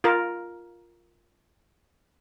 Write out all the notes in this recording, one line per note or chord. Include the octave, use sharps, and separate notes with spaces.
F4 A#4